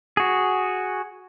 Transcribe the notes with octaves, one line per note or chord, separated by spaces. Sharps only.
F#4 G#4